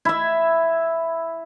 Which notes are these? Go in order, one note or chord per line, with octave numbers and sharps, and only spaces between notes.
E4 E5